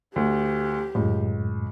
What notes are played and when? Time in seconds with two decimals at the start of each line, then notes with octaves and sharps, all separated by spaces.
0.16 D2 G4
0.95 C#2 F#2 A2